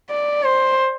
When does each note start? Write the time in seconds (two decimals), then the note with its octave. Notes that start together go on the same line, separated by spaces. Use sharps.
0.10 D5
0.43 C5